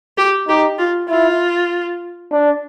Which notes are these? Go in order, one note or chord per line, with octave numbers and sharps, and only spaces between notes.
G4
D#4 G4
F4
E4 F4
D4